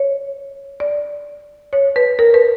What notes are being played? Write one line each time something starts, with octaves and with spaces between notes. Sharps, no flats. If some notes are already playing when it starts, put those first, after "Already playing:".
Already playing: C#5
D5
C#5
B4
A#4
B4